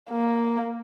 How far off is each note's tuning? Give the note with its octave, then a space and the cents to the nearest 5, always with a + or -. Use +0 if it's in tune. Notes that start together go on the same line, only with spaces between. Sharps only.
A#3 +0